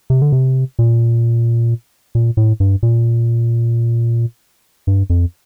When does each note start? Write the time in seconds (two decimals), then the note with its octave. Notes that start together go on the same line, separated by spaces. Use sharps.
0.10 C3
0.21 D3
0.32 C3
0.79 A#2
2.15 A#2
2.37 A2
2.60 G2
2.83 A#2
4.87 G2
5.10 F2